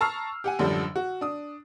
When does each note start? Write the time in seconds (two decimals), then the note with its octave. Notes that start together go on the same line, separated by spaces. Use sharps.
0.01 A5 A#5 C#6 E6 F6 C7
0.44 G4 F#5 G#5
0.59 A1 F#2 D3 F3 G3
0.96 F#4
1.21 D4 D#6